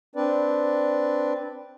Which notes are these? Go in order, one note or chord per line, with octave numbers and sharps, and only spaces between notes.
C4 D4 B4 D5